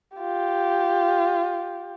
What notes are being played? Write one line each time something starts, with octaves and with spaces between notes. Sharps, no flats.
F4 G4